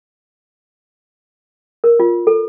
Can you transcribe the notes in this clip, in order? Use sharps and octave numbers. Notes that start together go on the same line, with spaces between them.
A#4
F4
A4